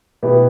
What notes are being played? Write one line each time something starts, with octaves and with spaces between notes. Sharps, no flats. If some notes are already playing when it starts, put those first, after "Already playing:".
B2 B3 E4 G4